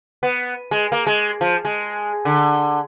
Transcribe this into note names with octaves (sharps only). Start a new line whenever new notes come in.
B3
G#3
A#3
G#3
F3
G#3
D3